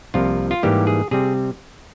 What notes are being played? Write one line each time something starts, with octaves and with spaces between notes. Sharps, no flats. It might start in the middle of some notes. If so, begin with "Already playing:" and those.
C2 C3 F3 A#3 F4
F4
G#2 E3 G3 A#3 G4
G#4
C3 G3 C4 G#4